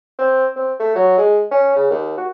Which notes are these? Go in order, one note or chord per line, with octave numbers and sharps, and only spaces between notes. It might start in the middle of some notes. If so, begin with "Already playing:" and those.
C4
C4
A3
F#3
G#3
C#4
C#3
D#2
F#4